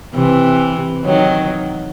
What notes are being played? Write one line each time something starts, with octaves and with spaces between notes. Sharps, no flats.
C3 E3
D#3 F#3